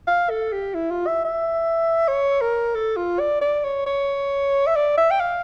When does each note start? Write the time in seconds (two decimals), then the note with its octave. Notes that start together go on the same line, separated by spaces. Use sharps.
0.07 F5
0.30 A4
0.52 G4
0.74 E4
0.91 F4
1.07 E5
1.25 E5
2.08 C#5
2.41 A#4
2.75 A4
2.96 F4
3.20 D5
3.41 D5
3.64 C#5
3.86 C#5
4.67 E5
4.76 D5
4.97 E5
5.11 G5
5.20 F5